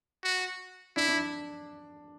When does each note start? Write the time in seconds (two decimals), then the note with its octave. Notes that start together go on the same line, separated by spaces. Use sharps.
0.24 F#4
0.96 D4 E4
1.09 D4